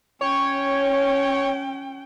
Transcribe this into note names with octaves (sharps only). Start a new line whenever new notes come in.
C#4 C#5 G5